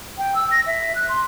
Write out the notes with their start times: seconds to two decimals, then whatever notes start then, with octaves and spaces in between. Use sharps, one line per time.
0.18 G5
0.35 E6
0.51 A#6
0.67 E5
0.95 F#6
1.09 C6